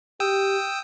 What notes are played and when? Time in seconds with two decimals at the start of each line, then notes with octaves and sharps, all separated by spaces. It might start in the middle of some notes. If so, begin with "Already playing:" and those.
0.20 G4 G5 D#6 E6